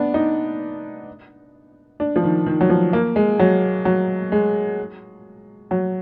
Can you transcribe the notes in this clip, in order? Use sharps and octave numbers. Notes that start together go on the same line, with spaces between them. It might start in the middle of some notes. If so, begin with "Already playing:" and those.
Already playing: B3 D4
D#4
D4
F3
D#3
D#3
F#3
F3
A#3
G#3
F#3
F#3
G#3
F#3